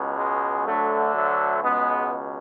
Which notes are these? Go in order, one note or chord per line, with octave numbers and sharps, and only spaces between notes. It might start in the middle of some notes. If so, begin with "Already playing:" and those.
Already playing: C#2 B2
G#3
D2 D3 F#3 A3
F#3 A3
C#2 B2 G#3 B3